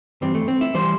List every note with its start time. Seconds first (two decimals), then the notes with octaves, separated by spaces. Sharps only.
0.21 G2 E3 G3 C4
0.35 A3
0.48 C4
0.61 E4
0.74 E3 G3 C5